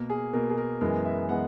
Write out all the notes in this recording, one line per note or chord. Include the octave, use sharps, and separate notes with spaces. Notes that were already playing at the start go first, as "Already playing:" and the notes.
Already playing: B2 A#3 A#4
G#4
B2 A#3 A#4
G#4
A#4
F#2 E3 G#3 B3 A#4
E5
E3 G#3 B3 F#5